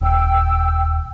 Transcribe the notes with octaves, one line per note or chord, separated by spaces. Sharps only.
D#1 G5 E6